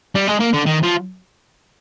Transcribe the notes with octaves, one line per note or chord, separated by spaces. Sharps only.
G3
G#3
A#3
D3
D#3
F3